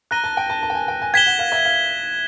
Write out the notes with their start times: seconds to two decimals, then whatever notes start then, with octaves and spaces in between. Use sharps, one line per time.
0.11 A#5 F#6 A#6 D#7 G7
0.24 A5
0.37 G5
0.50 A5
0.63 A5
0.70 G5
0.75 G#5
0.88 G5
1.02 G#5
1.14 G5 G#6 B6 E7 G7
1.27 F#5
1.39 F5
1.52 E5
1.65 F5